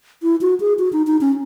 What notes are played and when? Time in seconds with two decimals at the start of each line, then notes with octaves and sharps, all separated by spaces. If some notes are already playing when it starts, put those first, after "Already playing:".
0.23 E4
0.41 F#4
0.60 G#4
0.79 F#4
0.93 D#4
1.07 D#4
1.21 C#4